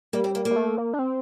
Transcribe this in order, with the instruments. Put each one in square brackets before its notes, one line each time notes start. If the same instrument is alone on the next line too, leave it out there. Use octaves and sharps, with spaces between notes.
[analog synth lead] G3 [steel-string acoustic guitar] A#3
[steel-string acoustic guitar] C4
A#3
A#3
[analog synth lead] G3
A3
A#3
D4
C4